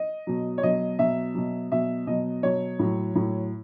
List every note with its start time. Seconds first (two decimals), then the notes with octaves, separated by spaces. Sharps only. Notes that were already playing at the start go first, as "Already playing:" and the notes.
Already playing: D#5
0.27 B2 F#3
0.58 C#5
0.63 B2 F#3 D#5
0.99 B2 F#3 E5
1.35 B2 F#3
1.72 B2 F#3 E5
2.07 B2 F#3 D#5
2.43 B2 F#3 C#5
2.79 A2 F#3
3.15 A2 F#3